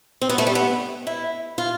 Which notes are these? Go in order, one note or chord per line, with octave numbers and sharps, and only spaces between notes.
C4
B3
A3
G3
B3
E4
F4